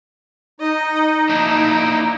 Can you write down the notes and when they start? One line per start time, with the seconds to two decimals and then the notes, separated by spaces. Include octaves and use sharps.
0.60 D#4 D#5
1.29 A#3 D4 E4